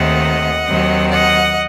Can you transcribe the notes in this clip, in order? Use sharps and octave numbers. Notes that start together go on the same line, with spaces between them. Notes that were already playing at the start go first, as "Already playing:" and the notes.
Already playing: D#2 D#3 A3 C4 D#5 F#5
D#2 D#3 F#3 C4
D#5 F#5